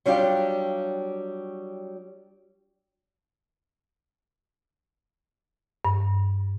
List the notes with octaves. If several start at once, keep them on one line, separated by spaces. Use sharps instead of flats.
F#3 G3 D4 F4 G4
G2